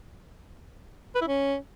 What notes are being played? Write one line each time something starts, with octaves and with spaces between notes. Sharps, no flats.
B4
E4
C#4